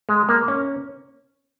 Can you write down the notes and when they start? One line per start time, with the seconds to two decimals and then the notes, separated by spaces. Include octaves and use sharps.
0.09 G#3
0.29 A#3
0.48 C#4